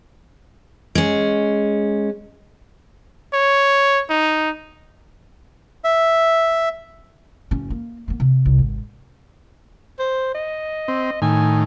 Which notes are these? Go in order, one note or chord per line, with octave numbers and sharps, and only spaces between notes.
G#3 C#4
C#5
D#4
E5
F#1 C#4
A#3
A#3 B3
C3
C2
G#1
C5
D#5
C4
A2 D#3 G#5